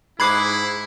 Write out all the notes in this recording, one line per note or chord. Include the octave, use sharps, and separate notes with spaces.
G#2 E4 G#4 B5 D6 F#6 G#6 C7